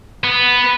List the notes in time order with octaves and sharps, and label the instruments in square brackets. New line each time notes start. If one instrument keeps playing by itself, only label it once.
[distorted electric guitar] B3